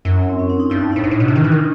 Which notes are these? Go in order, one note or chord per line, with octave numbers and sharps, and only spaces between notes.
F#2 E4
C4
C#4
D4
D#4
G2 E4
D#4
A2 D4
G#2
A2
B2
C3
D#3
E3
D#3